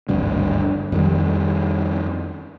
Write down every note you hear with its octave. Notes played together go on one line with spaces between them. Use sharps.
G#1 D2 G2 D3
F2 D#3 G3